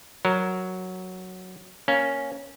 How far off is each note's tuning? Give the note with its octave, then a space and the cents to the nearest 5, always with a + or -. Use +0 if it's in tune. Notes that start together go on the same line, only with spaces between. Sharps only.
F#3 +0 A#4 +0
A#3 +0 C#4 +0